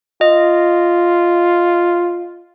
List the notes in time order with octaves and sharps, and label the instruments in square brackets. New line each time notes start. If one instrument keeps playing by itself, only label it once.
[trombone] F4 [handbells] D#5